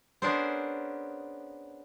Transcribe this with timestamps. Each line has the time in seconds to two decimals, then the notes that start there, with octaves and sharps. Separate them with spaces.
0.22 B3 C#4 D4 G#4 A#4 C5